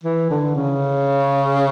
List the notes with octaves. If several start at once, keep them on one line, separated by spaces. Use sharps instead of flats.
E3
D3
C#3